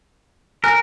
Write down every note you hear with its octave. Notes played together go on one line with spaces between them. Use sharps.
A#4 G#5 F6 F#6